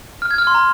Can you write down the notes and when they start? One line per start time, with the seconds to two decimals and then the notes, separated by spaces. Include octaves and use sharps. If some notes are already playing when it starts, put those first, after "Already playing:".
0.22 F6
0.31 G#6
0.38 F6
0.47 C6
0.54 A#5